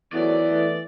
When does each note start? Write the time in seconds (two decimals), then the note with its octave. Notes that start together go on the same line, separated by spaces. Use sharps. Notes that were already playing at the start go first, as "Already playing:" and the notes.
0.13 E2 D#3 F#3 A3 D5
0.49 E3 A3